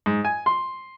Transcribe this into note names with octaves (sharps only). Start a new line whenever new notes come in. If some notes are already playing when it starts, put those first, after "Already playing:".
G#2
G#5
C6